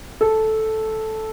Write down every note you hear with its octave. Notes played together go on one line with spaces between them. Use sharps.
A4